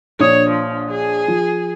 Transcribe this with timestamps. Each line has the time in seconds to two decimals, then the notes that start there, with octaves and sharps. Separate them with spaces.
0.20 A#1 D4 C#5 D#6
0.50 F3
0.91 G#4
1.28 F3